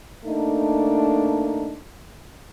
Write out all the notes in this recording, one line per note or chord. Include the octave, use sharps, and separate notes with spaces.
A3 A#3 D4 D#4